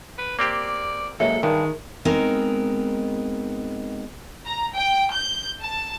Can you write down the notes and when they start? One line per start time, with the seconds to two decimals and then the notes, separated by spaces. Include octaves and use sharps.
0.18 B4
0.39 A#3 C4 G4 D5
1.20 B1 F#3 G#3 A#3 A4 E5
1.43 G2 D#3 G#3 A#4
2.05 G#3 B3 C4 D#4 A#4
4.46 A#5
4.76 G5
5.15 G6
5.63 A5